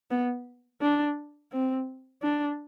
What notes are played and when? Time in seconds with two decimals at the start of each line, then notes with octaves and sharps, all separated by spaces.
0.11 B3
0.81 D4
1.52 C4
2.22 D4